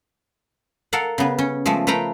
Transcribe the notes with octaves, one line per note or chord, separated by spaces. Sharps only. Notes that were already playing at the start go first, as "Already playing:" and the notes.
A4 A#4 F5 F#5
C#3 B3
C#4
F3 G#3 A3
A3 B4 F5 G5 A#5 B5